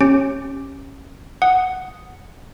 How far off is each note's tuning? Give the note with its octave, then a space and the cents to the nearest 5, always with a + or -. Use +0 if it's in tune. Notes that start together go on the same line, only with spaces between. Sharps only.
C#4 -20 G4 +0
F#5 +0 D#6 +0